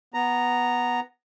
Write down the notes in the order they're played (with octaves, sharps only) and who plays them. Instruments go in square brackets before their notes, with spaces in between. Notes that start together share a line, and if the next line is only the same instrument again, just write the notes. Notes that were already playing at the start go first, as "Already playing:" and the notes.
[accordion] B3 A#5